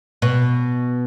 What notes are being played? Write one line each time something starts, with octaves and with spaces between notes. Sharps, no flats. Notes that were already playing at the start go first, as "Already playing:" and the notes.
B2